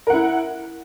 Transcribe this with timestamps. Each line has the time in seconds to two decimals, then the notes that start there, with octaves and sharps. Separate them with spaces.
0.07 A#4
0.10 F#5
0.13 E4